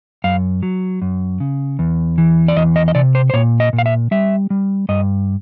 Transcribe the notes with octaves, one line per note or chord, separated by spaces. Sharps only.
F#2 F5
F#3
F#2
C#3
E2
E3
D5
E2 D#5
D#5
D#5
C3 D5
C5
C5
A#2 C#5
D#5
A#2
F5
E5
G3 E5
G3
G2 D#5